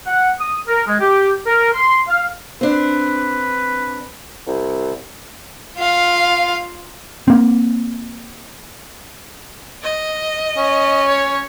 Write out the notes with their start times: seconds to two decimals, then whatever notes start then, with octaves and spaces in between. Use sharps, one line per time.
0.07 F#5
0.41 D#6
0.68 A#4
0.87 G#3
1.00 G4
1.47 A#4
1.73 C6
2.09 F5
2.61 C4 D4 B4
4.47 C2
5.77 F4 F5
7.28 A#3 C4
9.83 D#5
10.57 C#4
11.09 C#5